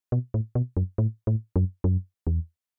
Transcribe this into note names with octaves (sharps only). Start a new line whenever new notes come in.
B2
A2
B2
F#2
A2
A2
F#2
F#2
E2